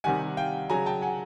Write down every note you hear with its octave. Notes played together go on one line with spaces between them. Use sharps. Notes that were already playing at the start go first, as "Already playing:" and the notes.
C3 D#3 G3 F#5 G#5
F5 G5
C#3 F#3 G#5 A#5
G5 A5
F#5 G#5